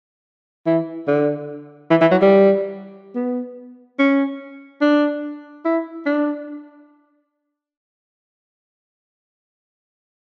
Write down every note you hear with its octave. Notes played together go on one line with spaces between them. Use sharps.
E3
D3
E3
E3
F#3
G3
B3
C#4
D4
E4
D4